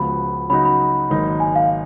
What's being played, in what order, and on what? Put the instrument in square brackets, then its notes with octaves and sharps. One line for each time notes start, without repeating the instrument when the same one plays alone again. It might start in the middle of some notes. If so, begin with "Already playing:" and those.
Already playing: [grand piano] C#2 C#3 F3 B3 F#4 [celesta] B5
[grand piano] C#3 F#3 B3 D#4 F#4 [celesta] B5
[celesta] B5
[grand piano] G#1 G#2 F#3 A#3 D#4
[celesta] G#5
F5